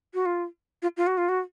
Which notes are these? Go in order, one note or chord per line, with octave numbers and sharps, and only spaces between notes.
F#4
F4
F4
F4
F#4
F4
F#4